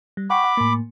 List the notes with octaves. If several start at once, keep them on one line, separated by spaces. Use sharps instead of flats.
G3
F#5 G5 B5 C#6 D6
F#5
A2 A#3